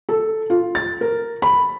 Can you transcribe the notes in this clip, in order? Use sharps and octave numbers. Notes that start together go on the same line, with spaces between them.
A4
F4
A6
A#4
B5